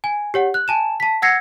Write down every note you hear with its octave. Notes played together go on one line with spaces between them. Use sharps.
G#5
G4 C#5 F#5
F#6
G#5 A5 E7
A5 B6
F#5 E6 G#6 A#6 C7 C#7